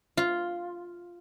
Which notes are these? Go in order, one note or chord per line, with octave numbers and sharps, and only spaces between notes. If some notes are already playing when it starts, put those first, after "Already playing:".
F4